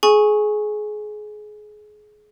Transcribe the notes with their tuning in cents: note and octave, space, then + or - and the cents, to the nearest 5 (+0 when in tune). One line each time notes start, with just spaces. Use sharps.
G#4 +25 G#5 +0 C#6 -10